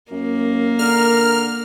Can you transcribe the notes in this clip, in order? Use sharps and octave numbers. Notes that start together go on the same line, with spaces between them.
F#2 A#3
D3 A#4 F6